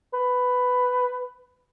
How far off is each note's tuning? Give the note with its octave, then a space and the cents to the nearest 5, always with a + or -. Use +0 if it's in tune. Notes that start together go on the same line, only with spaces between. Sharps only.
B4 +10